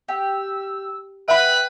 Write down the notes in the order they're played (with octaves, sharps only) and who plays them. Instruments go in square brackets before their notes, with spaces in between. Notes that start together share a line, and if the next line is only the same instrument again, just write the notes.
[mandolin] G4 [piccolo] E6
[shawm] B4 [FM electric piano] E5 F#5 B5 [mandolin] G5 [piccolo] F#7